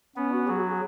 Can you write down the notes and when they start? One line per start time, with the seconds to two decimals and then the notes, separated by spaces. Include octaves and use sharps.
0.16 B3 C#4
0.32 F#4
0.48 F#3 G#4
0.59 F#4
0.70 G#4